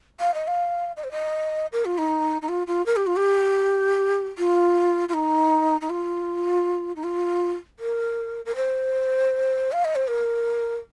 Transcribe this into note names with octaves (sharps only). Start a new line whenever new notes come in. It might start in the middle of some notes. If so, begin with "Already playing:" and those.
F5
D#5
F5
D#5
C5
D#5
A#4
F4
D#4
D#4
F4
F4
A#4
G4
F4
G4
F4
F4
D#4
D#4
F4
D#4
F4
A#4
A#4
C5
F5
D#5
C5
A#4